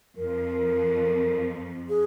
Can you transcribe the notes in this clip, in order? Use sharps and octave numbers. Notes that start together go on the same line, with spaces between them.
F2 F3 A#4
G#4